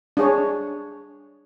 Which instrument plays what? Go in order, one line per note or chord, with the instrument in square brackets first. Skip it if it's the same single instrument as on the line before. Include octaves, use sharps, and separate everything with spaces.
[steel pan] D4 G#4 C#5